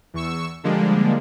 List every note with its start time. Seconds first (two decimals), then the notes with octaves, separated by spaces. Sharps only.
0.14 E2 C#6 E6
0.64 D3 F3 G3 G#3 A#3 D4